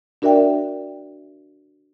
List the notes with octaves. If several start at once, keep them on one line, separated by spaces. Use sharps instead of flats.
D4 F#4 A#4 D5 E5 G5